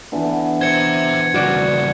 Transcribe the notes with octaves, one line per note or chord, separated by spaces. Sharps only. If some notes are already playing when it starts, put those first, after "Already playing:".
D3 E3 B3
C5 E5 G#6 C#7
G2 C#3 F#4 D5